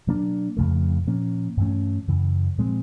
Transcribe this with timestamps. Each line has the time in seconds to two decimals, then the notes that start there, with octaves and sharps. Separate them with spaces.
0.07 B2 F#3 A#3 D4
0.57 F2 C#3 F3 A3
1.07 A#2 F3 A#3 C#4
1.57 G2 E3 A3 C#4
2.08 F#2 C#3 E3
2.58 A#2 F3 G#3 C4